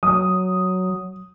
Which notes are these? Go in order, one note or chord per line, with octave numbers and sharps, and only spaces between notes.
F#3 D#6